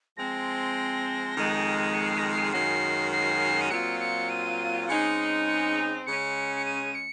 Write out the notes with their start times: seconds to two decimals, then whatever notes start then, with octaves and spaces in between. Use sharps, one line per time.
0.17 F3 G#3 C4 A#6
1.36 F2 D#3 G#3
1.94 C#7
2.06 C7
2.19 A#6
2.32 C7
2.52 F#2 D#3 G#3 C#4 F#4 C7
3.12 C7
3.61 D#7
3.70 A#2 F#3 C4 F4 C#7
4.00 C#7
4.30 D#7
4.88 C#3 G#3 C4 D#4 G#4 C#7
5.48 C#7
6.06 C#3 G#3 C#4 C#7
6.56 C#7
6.65 D#7
6.95 C#7